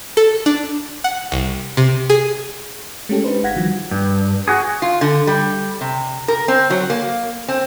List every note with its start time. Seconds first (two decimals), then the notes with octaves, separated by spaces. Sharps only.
0.17 A4
0.46 D4
1.04 F#5
1.32 C2
1.77 C3
2.10 G#4
3.09 G#3 A3 C#4 G4 A4
3.24 G#3 D4 D#4 B4 C5
3.43 G1 F5 F#5 G#6 A#6 B6
3.56 D#3 F3 G3 F#4
3.91 G2
4.48 F#4 G#4
4.82 F4
5.01 D3
5.27 G3
5.81 C3
6.28 A#4
6.48 C4
6.70 F#3
6.90 A#3
7.48 C4